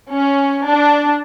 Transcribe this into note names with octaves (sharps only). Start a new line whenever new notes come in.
C#4
D4